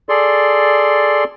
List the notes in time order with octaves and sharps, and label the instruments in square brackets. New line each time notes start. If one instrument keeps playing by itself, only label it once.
[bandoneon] G#4 A4 D5 C6